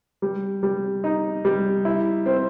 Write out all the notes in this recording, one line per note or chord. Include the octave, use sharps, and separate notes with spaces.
G3
G3
D#4
G3
E4
C4